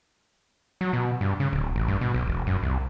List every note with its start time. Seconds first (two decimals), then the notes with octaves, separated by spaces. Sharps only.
0.81 F#3
0.93 B2
1.21 G2
1.40 C#3
1.53 D1
1.76 A1
1.88 G2
2.01 B2
2.14 B1
2.27 E1
2.47 F#2
2.63 C2